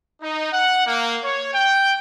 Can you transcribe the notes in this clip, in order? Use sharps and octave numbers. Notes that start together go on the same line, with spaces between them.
D#4
F#5
A#3
C#5
G5